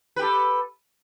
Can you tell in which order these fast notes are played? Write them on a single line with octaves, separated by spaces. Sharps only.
B4 G4 A4